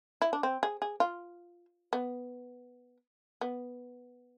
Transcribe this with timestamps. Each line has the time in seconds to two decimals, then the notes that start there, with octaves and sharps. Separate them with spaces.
0.22 E4
0.33 D4
0.43 C4
0.63 G#4
0.82 G#4
1.00 F4
1.93 B3
3.41 B3